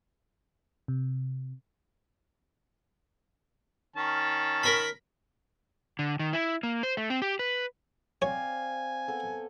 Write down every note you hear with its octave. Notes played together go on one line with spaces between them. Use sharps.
C3
D#3 C#4 A5
A#4 B5
D3
D#3
E4
A#3
C5
A3
C4
G4
B4
C4 C#5 D5 F5 G#5
B3 A4